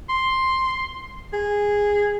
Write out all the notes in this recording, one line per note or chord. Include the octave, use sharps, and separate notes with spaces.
C6
G#4